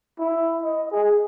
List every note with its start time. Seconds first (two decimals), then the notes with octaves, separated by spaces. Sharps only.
0.19 E4
0.63 D#5
0.91 G#4